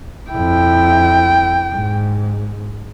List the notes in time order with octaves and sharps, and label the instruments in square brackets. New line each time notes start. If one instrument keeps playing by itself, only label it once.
[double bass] F2 E4 [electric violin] G5
[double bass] G#2